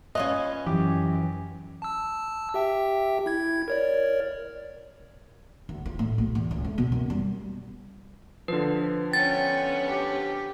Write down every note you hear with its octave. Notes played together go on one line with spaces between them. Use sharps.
C#4 F4 B4 D#5
F#2 E3 G4
A5 E6
G4 E5 G5
E4 G#6
A#4 C#5 D5
D2
F4
A2
B1
E2
C#2
A3
B2
F#2
G3
D3 F3 B4
B3 C#4 G5 A6
G4